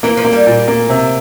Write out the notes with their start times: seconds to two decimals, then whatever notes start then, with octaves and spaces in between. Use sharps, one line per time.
0.03 E3 A#3
0.17 F3
0.25 A#3
0.33 G3
0.47 A#2
0.68 A#3
0.89 C3